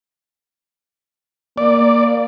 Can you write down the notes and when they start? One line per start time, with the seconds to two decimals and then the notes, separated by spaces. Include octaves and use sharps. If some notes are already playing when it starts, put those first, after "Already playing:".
1.58 A#3 D5